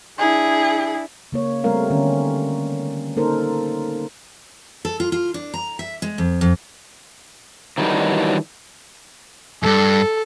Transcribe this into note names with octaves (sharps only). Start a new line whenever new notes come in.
D4 E4 G#4
C#3 A#3 C#5
G3 A3 C4 A#4 F5
D3 D#3 B3 C#4
A#3 D#4 A4 A#4 C5
A4
F4
F4
D4
A#5
E5
G#3
F2
F2
D#3 E3 F#3 G3 D4 D#4
E2 G2 A4